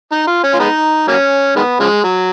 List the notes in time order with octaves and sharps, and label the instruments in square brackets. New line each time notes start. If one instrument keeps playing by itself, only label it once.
[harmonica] D#4
F4
C#4
F4
G#3 B3 D#4
F#3 A#3 C#4
D#3 G#3 B3
C#3 F3 G#3
F#3